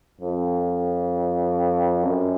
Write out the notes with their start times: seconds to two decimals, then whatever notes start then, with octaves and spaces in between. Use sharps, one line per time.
0.20 F2
2.03 F#2